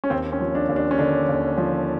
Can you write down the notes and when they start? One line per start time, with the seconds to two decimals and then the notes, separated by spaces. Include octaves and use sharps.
0.04 C#4
0.10 D#2 C4
0.32 C#4
0.40 F3
0.55 D4
0.69 D#2
0.76 D4
0.91 C#4
0.99 D3 D4
1.29 D#2
1.58 F3